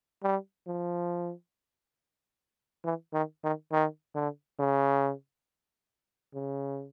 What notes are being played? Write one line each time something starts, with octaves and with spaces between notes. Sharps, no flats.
G3
F3
E3
D#3
D#3
D#3
D3
C#3
C#3